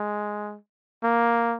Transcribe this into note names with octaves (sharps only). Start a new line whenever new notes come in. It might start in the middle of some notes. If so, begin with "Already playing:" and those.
Already playing: G#3
A#3